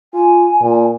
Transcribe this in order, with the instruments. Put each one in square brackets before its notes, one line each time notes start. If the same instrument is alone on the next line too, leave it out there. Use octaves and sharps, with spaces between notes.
[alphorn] F4 [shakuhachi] G#5
[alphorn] A#2